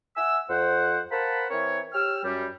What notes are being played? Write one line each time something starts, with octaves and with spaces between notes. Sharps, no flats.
E5 F#5 G#5 E6
F2 C5 F#5
A#4 C5 F5 F#5 A5 B5
E3 C4 A#4 C#5
G4 C#5 G5 E6 F6
F#2 G3